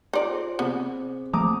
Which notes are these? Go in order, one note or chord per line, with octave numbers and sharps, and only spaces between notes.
D#4 F4 C5 D5 C6
G#4 C5
C3 B3
F3 A3 A#3 C4 A#5 D6 D#6